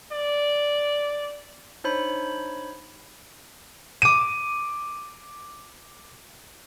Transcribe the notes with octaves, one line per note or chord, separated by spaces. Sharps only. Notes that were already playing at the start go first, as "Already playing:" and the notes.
D5
D4 D#4 C5 C#5 B5
D6 D#7